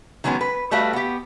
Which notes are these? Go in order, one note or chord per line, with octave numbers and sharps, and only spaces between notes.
D#3 F#3 G#3 B3 C#4
B4
G3 A3 F#4 B4 E5 F5
B3 G4